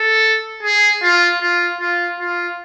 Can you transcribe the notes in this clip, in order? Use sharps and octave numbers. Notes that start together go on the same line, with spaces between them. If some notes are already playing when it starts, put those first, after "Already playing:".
Already playing: A4
G#4
F4
F4
F4
F4